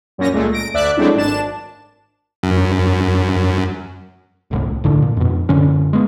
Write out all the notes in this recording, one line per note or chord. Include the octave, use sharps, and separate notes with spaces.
F#2 A#2 C#4 A#6
C#2 A#2 G#3 A3
A#6 D7
D2 D5 E5 D6 F#6
F#3 G#3 A3 C4 D4 E4
G#1 D4 A5 E7
F#2
D1 C2 A2
A#1 A2 D3 D4
A#2
F2 B2
D1 F#2 D3 C#4
G#3 B3